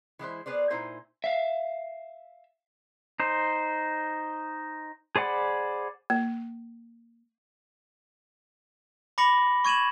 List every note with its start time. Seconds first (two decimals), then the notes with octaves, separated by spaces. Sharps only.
0.19 E3 G#3 E4 C5
0.46 B3 G#4 B4 C5 D5
0.70 A#2 D#4 E4 C5 G#5
1.24 E5 F5
3.20 D#4 C5
5.16 G#4 C5 D5 F#5 B5
6.10 A#3
9.18 B5 D6 A#6 C#7 F#7
9.65 C#6 G#6 D#7 E7 F#7